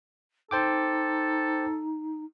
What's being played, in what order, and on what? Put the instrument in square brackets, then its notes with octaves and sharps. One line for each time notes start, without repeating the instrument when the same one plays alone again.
[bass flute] D#4 [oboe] A4 [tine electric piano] C5 G5 D6